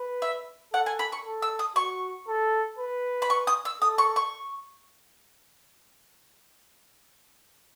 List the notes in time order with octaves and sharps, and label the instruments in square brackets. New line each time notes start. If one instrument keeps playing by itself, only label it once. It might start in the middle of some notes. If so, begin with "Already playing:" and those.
Already playing: [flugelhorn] B4
[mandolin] E5
[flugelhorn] A4 [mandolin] F#5
[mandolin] G#5
B5
C#6
[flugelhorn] A4
[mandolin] E6
D#6
[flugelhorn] F#4 [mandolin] C#6
[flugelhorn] A4
B4
[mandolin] B5
C#6
D#6
E6
[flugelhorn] A4 [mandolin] D#6
[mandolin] C#6
C#6